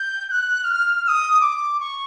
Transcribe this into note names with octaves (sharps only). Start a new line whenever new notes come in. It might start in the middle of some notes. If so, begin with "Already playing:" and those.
Already playing: G6
G6
F#6
F6
F6
D#6
D6
C#6